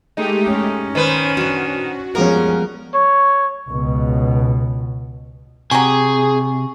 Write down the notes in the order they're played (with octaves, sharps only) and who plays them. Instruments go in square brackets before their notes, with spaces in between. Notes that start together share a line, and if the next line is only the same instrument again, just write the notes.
[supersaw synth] G#3 A3 G4 [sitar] D#4
[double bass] C#4
[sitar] D#3 B4 [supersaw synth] C5
[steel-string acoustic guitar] D4 C5 [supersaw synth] F#4
[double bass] F3 C#4 [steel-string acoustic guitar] G3 G#3 B3 [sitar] A#4
[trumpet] C#5
[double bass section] C#2 B2
[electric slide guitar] C3 [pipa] F#3 G4 [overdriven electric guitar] G#4 [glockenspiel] G#5 C#6